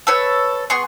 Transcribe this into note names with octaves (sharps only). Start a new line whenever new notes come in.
A4 B4 C#5
B3 G#4 C6 C#6